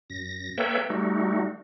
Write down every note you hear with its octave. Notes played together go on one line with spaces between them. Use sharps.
F#2 A#6
A#3 A4 B4 C#5 E5 G5
G3 A3 D#4 F#4